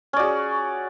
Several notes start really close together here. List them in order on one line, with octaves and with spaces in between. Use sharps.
C#4 D5 F#4 G#4